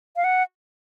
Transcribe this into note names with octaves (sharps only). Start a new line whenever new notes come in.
F5
F#5